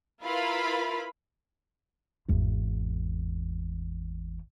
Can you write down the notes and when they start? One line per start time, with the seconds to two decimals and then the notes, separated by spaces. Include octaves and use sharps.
0.23 E4 F4 A#4 B4 F5 B5
2.29 G#1 E2